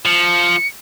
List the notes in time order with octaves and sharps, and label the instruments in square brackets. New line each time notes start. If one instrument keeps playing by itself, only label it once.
[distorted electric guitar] F3 [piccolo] C#7